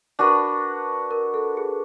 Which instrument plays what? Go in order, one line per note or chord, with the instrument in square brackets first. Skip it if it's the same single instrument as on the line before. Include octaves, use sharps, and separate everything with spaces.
[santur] D4 F#4 B4 [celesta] A#4
[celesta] A#4
A4
G#4